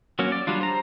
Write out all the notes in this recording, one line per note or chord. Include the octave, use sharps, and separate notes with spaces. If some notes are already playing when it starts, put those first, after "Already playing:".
F#3 A#3 C#4 F#4
D5
F#3 G3 D4 F4
C5 A#5